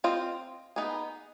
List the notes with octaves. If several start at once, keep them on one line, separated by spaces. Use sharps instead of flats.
C4 F4 C5 D#5
B3 D#4 G#4